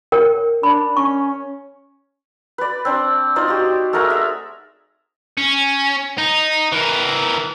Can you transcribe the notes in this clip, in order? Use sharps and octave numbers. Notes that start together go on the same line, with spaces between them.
A#4 C#5 G5
D4 B5
C#4 C#6
B4 D5
C4 D4
D#4 F4 C5 D5
F#4 G4
A3 G#4 A#4 F#5
E5
C#4
D#4
E3 A#4